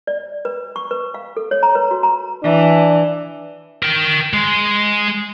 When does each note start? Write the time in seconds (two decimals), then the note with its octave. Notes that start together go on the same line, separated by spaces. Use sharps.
0.07 D5
0.45 B4
0.76 C#6
0.91 B4
1.14 F5
1.37 A4
1.51 C#5
1.63 A#5
1.75 B4
1.91 F#4
2.03 A#5
2.43 E3 D4
3.83 A#4 G5
4.33 G#3